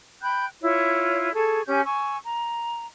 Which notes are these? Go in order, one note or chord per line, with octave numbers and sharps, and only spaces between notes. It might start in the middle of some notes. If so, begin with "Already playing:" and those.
G5 B5 F#6 G6
E4 F4 C#5
G#4 A4 C#6 G#6
C#4 G4 G#5 G6
G#5 C#6 E6
A#5